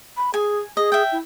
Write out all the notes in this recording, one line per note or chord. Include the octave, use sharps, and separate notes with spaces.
B5
G#4 G#5
G#4 D#5
E5 G5
E4